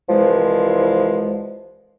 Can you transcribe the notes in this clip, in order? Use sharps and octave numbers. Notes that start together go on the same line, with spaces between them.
C2 E3 F3 G#3